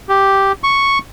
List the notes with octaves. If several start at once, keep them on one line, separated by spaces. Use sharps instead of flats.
G4
C#6